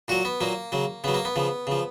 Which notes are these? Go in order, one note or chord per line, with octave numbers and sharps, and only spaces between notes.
A#2 F#3 F#4
B3
A#2 F#3 A#3
C#3 F#3
C#3 F#3 B3
A#3
B3
C#3 F3
C#3 F3